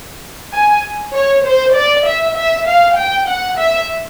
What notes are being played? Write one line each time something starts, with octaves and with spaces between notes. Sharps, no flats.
G#5
C#5
C5
D5
E5
E5
F5
G5
F#5
E5